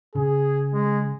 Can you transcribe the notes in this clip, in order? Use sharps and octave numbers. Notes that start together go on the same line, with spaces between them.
C#3 G#4
G#3